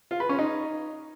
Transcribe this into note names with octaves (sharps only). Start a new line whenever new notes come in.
F4
B4
C#4
D#4